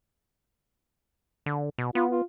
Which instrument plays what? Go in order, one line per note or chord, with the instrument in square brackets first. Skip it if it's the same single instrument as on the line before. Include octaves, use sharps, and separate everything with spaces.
[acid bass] D3
B2
[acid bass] B3 [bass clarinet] F4
[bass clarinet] F4